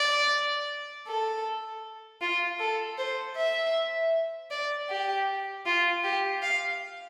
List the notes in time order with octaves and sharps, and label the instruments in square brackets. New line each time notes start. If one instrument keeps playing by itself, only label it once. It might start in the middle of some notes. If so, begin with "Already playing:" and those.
Already playing: [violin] D5
A4
F4
A4
C5
E5
D5
G4
F4
G4
F5